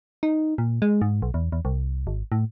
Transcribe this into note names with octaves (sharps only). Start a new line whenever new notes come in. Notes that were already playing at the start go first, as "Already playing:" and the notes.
D#4
A#2
G#3
G#2
B1
E2
E2
C2
G#1
A2